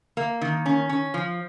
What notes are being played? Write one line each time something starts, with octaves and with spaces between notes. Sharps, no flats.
A#3
D#3
C#4
C#4
F3